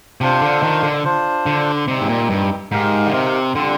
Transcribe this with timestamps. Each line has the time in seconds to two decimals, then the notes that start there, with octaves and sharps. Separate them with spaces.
0.21 C3 D4 F4 C5 F5
0.42 D3
0.63 D#3
0.83 D3
1.05 D4 F4 C5
1.46 D3
1.88 C3 G3 C4 D#4 G4
2.01 G#2
2.09 A#2
2.30 G2
2.72 G#2 D#4 G4 A#4 F5
3.07 D3
3.14 C3
3.55 D3 G3 C4 F4